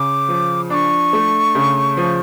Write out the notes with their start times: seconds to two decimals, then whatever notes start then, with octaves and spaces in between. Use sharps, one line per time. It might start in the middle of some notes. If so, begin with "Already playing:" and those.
Already playing: C#3 D6
0.29 F3
0.70 D4 D6
0.74 C#6
1.13 A3
1.55 C#3
1.97 F3